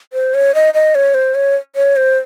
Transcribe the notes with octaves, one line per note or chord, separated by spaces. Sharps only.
C5
C#5
D#5
D#5
C#5
C5
C#5
C#5
C5